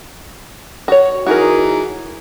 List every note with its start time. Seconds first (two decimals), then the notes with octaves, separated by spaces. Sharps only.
0.88 F#4 C#5
1.26 E3 D#4 F#4 G#4 A#4